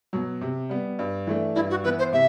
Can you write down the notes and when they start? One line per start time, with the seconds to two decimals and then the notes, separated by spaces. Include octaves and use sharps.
0.13 B2 F#3
0.41 C3
0.69 G3 B3
0.99 G2
1.27 E3 A3 D4
1.55 G2 E4
1.70 F#4
1.84 E3 B3 E4 B4
1.98 C5
2.12 C3 E5